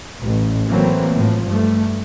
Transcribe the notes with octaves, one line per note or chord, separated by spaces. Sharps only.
A1
E3 F#3 A3 A#3 C4
A2 F3
G2 A3